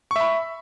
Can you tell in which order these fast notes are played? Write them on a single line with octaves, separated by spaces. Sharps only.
C#6 E5 B5